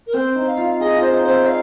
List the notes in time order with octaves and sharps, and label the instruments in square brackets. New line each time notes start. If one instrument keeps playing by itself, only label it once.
[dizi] A#4
[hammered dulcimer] C4 [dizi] C5
[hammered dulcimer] D#4
[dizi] F5
[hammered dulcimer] F4
[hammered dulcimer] G#4 [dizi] D#5
[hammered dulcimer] F4
[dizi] C5
[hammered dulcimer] D#4
[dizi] C5
[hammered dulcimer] C4
[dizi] F5